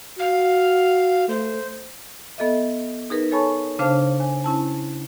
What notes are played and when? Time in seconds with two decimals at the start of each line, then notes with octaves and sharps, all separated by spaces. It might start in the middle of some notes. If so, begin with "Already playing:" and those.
0.19 F#4 F5
1.28 A3 C5
2.38 B3 A4 D#5 E5
3.10 D#4 G#4 A#4 B4
3.32 A4 C#5 G#5 A5 B5 C#6
3.79 C#3 D4 C5 F5 A5 F6
4.20 G#5
4.44 C#4 E4 A5